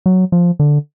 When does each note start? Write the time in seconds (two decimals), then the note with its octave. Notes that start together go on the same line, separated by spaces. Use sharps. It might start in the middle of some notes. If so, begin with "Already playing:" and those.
0.06 F#3
0.32 F3
0.59 D3